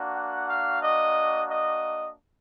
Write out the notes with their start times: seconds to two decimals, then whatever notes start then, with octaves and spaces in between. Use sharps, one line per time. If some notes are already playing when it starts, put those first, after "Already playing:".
Already playing: A#3 D4 F#4
0.16 F#5
0.49 F5
0.83 D#5
1.50 D#5